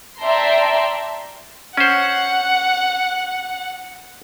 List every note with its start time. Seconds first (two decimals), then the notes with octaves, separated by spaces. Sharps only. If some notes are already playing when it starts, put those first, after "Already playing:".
0.21 D5 E5 G5 A5 A#5 C6
1.77 C#4 C5 F#5